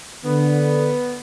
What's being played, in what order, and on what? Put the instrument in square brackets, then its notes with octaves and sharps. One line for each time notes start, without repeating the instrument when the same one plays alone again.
[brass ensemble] D3 [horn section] B3